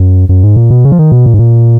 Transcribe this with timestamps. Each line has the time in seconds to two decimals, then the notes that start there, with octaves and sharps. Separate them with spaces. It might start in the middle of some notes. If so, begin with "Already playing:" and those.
Already playing: F#2
0.29 F#2
0.43 G#2
0.56 A#2
0.70 B2
0.85 C#3
0.92 F3
0.99 D#3
1.12 B2
1.26 A#2
1.34 G#2
1.39 A#2